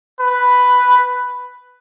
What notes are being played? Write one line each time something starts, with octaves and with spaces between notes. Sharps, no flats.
B4